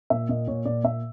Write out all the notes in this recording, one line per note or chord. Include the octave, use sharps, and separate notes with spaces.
A#2 E5
A#2 D#5
A#2 C#5
A#2 D5
A#2 E5